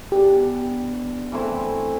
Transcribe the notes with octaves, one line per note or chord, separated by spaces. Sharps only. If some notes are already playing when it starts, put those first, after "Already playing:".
E3 B3 D4 G4
E3 A3 C4 E4